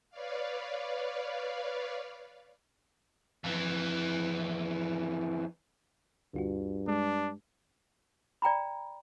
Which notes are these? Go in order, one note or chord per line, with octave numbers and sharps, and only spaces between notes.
B4 C#5 D5 F5
F2 E3
D2 G2 F4 F#4
G#3 D4
D5 G5 A#5 B5